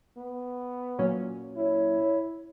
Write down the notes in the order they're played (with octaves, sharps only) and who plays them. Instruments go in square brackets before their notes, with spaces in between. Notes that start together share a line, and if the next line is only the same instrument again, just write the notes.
[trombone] B3
[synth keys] A#2 F#3 C#4
[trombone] E4 [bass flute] C#5